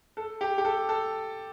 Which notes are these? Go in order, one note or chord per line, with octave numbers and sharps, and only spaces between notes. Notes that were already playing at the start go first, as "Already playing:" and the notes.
A4
G4
G4
A4
A4